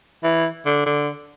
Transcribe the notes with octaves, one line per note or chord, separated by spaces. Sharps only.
E3
D3
D3